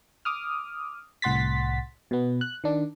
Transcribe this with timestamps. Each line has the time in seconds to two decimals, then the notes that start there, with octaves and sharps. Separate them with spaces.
0.25 D6 D#6 F6
1.22 C2 A2 F#5 C6 A6 B6
2.11 B2 B3
2.41 F#6
2.64 D#3 D4